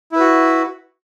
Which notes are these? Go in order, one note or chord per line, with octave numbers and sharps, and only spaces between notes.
E4 F#4 B4